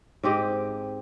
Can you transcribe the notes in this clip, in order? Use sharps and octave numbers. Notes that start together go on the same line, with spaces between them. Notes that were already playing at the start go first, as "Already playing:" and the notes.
G#2 C4 G4 D#5